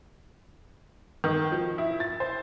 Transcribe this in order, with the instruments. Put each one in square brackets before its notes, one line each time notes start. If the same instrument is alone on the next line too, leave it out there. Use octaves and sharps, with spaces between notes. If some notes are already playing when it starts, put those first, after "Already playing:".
[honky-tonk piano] D#3
F3
E4
A6
C5